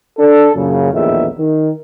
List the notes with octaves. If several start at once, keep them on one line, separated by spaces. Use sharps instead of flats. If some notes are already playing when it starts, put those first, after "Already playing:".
D4 A4
F#2 A#2 C#3
A#1 E2 A2 D#3 E5
D#3